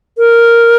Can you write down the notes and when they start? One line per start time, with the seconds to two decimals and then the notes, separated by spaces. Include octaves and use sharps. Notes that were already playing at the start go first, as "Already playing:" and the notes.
0.18 A#4